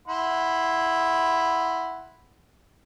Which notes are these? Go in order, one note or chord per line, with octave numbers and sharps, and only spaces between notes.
E4 F#5 C6